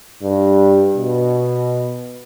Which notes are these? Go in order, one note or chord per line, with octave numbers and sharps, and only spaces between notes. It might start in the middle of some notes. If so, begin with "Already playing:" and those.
G2
B2